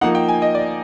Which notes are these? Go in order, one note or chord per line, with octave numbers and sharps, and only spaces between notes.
F3 A#3 D#4 F#5
G5
G#5
D#5
D5